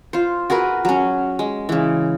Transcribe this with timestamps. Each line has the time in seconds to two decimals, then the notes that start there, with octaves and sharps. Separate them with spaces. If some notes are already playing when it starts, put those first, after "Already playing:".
0.13 F4 C5
0.50 F#4 G#4 A#4 B4
0.85 F#3 C#4
1.39 G#3
1.69 C#3 E3